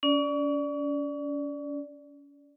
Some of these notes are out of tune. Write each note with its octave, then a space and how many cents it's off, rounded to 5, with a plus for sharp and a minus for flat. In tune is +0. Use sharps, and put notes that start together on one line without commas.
C#4 +40 D5 +0